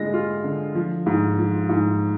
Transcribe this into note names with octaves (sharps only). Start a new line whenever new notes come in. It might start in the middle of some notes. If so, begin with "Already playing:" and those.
Already playing: D3 G#3 F4 A#6
F4
D3
F3
G#2
F3
G#2